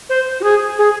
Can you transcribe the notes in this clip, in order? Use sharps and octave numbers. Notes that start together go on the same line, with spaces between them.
C5
F#4
G#4
G#4